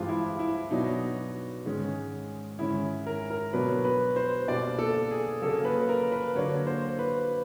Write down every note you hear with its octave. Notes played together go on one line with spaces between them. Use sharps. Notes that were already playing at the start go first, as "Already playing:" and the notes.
Already playing: G2 E3 G#3 C4 F4
E4
E4
B2 F#3 B3 D4 D#4
G#2 D#3 G#3 C#4
G#2 D#3 G#3 C#4 E4
A#4
A#4
B2 F#3 B3 D4 B4
B4
C5
B2 G3 A#3 D4 D5
A4
G#4
C#3 F#3 A#3 C#4 A4
B4
A#4
B4
D3 F#3 A#3 D4 C#5
C5
B4